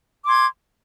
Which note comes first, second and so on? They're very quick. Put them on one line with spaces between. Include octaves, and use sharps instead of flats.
D6 C6 G#6